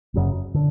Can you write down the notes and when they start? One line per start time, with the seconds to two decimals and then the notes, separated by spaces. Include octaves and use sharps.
0.14 F#1 F#2 C#3
0.54 D3